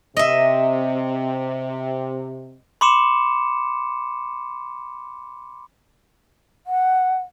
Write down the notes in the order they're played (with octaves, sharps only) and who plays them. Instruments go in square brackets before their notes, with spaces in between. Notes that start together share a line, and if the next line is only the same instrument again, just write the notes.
[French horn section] C3 [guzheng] D#5 E5
[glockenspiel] B5 C6 D6 C#7 E7
[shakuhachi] F#5